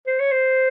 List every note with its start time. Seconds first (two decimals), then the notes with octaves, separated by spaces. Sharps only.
0.08 C5
0.20 C#5
0.32 C5